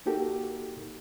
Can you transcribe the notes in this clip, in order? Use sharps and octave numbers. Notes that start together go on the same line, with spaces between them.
A#3 D#4 F#4 G4 A4 A#4